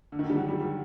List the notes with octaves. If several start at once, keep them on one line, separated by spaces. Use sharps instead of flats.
D3
D#3
D3
G3
F#3
G3
G3